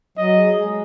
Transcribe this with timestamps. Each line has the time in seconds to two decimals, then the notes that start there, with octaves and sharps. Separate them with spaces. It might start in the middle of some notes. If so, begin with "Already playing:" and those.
0.17 F#3 D#5
0.37 G#4
0.56 G#3